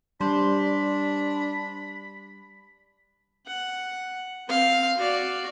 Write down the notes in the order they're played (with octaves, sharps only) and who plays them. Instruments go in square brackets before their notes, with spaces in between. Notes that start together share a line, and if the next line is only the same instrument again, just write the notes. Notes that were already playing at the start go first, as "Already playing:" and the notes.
[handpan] G3 [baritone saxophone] D4 [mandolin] C5 [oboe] B5
[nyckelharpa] F#5
C4 F5
F#4 D5